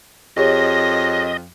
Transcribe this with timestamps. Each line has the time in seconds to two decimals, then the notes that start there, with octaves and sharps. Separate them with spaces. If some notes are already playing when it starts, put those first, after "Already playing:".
0.37 F2 G4 G#4 C#5 D#5 A#6